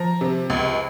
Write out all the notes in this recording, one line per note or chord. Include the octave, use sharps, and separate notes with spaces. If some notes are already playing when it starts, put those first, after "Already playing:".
Already playing: F3 A#5
C3
C#2